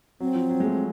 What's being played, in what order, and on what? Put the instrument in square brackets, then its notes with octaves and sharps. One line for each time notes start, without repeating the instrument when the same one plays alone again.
[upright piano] F#3 [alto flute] C4
[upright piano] F3
F#3
G#3
A3